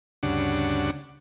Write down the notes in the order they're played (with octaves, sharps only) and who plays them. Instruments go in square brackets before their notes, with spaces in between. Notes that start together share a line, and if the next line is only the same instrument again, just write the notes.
[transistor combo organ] D2 G2 C#3 D4 F#5